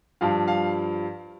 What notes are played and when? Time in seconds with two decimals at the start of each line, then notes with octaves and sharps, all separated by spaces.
0.21 G2 F3 F5
0.48 F5